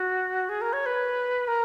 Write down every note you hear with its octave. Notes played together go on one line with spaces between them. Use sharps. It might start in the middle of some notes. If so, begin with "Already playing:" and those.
Already playing: F#4
G#4
A#4
C#5
B4
A#4